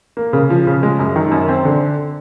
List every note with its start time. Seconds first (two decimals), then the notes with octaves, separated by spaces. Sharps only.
0.17 A#3
0.33 C#3
0.50 F3
0.67 C#3
0.83 G#3
0.99 F#2
1.16 D#3
1.32 F#2
1.48 C4
1.65 D3